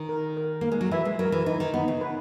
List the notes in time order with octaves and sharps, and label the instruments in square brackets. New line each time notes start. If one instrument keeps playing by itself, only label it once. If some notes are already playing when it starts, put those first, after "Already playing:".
Already playing: [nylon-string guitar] D#3
[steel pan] A#4
A#4
[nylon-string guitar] A#3 [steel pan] A#4
[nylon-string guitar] G#3
F#3
[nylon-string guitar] E3 [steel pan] E5
[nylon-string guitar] G#3
[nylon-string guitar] F#3 [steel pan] A#4
[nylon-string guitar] E3
[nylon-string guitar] E3 [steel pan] D#4
[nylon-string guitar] D#3
[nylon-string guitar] B3 [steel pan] D#4
[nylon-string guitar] C#3
[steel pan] B4